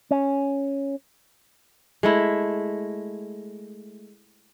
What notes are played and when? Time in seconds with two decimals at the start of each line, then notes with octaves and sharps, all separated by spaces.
0.11 C#4
2.03 G#3 A3 E4